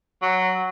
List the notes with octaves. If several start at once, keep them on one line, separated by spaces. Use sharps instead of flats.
F#3